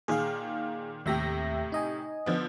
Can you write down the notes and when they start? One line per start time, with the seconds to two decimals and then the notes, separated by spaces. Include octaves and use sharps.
0.08 A#2 D#3 G#4 F5
1.06 D#2 A2 C3 G4 E5 A#6
1.72 D#4 D#5 G#5
2.26 D3 F3 B3